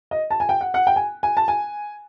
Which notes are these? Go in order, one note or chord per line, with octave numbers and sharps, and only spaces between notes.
D#5
A5
G#5
G5
F#5
F#5
G5
G#5
G#5
A5
G#5